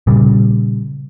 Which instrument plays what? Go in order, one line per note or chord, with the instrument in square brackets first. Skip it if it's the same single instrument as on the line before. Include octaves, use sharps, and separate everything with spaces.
[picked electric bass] A#2 C#3 G3